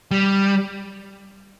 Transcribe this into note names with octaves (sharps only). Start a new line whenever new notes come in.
G3